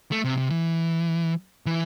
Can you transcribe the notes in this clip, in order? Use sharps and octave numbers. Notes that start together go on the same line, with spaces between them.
A3
C3
C3
E3
E3